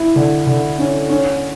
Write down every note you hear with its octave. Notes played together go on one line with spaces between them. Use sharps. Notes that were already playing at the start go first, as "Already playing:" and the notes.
Already playing: E4
D3
D3
C#4
C#4